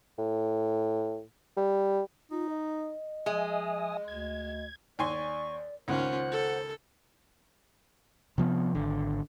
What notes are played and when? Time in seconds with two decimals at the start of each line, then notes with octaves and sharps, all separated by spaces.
0.19 A2
1.57 G3
2.31 D#4 F4
2.49 D#5
3.26 F3 G#3 E5 G#5 D#6
4.08 D2 G#6
4.99 D#2 D5 G#5 C6 C#6
5.88 C#2 D#3 A#3 C#4 F4 C5 F#5
6.31 A4
8.38 C3 F3 B3
8.75 G#1 D3